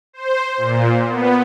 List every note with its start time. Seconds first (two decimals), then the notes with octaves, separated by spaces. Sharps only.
0.13 C5
0.57 A#2
1.08 B3